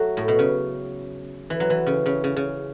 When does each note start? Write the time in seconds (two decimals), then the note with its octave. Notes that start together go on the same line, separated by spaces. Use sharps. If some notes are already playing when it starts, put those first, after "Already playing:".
Already playing: F#3 A3
0.17 A2
0.28 B2
0.39 C#3
1.50 E3
1.60 F#3
1.70 E3
1.86 C#3
2.06 C#3
2.24 C#3
2.36 C#3